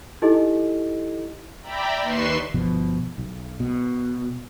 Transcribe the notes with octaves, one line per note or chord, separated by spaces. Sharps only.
D#4 E4 G4 A4 D#5
D5 E5 G5 A#5 B5
D#2 B4 C6 C#6 C7 E7
G1 B2 F3
B1
B2